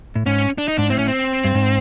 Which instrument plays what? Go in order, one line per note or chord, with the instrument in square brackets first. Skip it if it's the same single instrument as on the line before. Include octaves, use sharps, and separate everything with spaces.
[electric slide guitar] A2
[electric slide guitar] G#2 [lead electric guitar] C#4
[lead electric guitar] D4
D#4
[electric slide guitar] G#2 [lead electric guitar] D4
[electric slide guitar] A2 [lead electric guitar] C4
[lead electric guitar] C#4
C4
[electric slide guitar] G2
G#2